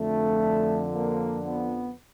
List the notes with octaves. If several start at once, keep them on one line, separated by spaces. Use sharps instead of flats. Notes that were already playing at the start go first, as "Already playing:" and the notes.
Already playing: F2 D3 F3 A3
A#3
B3